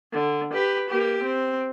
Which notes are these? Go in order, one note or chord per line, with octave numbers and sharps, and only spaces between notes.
D3
G4 B4
A#3 G4
C4